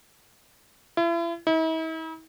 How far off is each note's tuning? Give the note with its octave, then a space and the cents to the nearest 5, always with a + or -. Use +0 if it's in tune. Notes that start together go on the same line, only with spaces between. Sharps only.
E4 +40
E4 -45